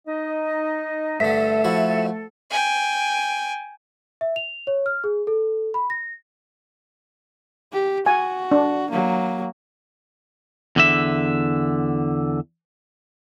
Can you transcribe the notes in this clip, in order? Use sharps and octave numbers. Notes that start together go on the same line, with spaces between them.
D#4 D#5
G2 D3 A3 A4 E5
F3 E4 F#4
G5 G#5
E5
F7
C#5
F6
G#4
A4
B5
A#6
G4
F#4 G#5
D4
F#3 A#3
E2 D3 E5